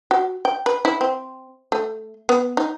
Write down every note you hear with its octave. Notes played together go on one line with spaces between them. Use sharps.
F#4
G5
B4
E4
C4
A3
B3
D#4